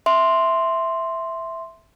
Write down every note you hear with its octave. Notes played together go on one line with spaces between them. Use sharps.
E5 C6